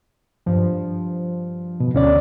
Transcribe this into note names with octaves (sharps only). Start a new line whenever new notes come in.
G2 F3
B2
D2 D3 C#4 D5